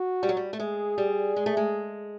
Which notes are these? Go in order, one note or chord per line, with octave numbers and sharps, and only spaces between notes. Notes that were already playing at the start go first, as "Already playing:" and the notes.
Already playing: F#4
G3
F#3
G3
A3
G#3 G#4
G3
G#3
A3
G#3